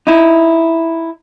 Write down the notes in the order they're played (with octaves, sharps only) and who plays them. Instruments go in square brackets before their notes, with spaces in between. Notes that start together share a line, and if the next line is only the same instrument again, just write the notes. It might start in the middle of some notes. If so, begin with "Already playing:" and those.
[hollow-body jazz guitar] D#4 E4